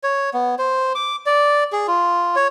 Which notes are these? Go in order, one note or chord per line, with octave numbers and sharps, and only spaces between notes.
C#5
B3
C5
D6
D5
G#4
F4
C#5